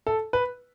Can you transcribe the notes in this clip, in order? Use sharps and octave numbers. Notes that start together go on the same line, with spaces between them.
A4
B4